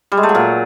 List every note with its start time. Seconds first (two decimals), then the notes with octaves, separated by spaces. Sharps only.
0.12 G3
0.17 G#3
0.23 A3
0.29 F#3
0.35 A#2